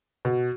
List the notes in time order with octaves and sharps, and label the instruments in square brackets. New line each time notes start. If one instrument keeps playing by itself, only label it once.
[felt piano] B2